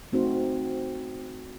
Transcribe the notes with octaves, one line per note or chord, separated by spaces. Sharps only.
A3 C4 D#4 F#4 C5